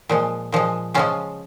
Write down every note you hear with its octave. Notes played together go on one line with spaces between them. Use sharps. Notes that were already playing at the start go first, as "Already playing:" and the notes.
A#2 F3 G#3
A#2 F3 G#3
C#3 F3 G#3 C#4 F4